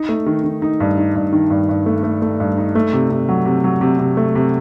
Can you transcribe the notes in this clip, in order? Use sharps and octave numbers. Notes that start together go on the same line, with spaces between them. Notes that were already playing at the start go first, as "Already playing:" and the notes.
Already playing: D#4
A3
D#3
D#3
D#4
G2
D#4
G2
D#3
G2
G2
A3
A3
A3
G2
D#4
A3
C3
C3
F#3
C3
F#3
C3
C3
A3
C3